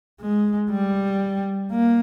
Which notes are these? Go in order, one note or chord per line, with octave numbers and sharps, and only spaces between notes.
G#3
G3
A#3